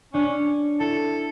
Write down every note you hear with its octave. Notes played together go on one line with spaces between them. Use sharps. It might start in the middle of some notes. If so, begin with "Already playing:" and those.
C#4 D4
E4 A4